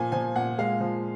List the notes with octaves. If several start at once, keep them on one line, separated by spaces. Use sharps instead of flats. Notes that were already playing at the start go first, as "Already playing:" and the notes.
Already playing: A#2 F3 G#5
F3 G#5
A#2 F#5
G#3 F5
F3